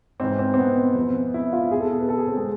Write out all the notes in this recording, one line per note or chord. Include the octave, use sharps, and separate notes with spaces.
G#2 E3 C4
C4
C4
B3
F2
E3
E4
F4
E2 B2 G#4
A4
B4
A4
G#4
C4
G#3